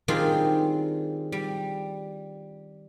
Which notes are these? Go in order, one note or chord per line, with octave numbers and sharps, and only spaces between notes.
D#3 G3 C4 D4 F4 G#4
G3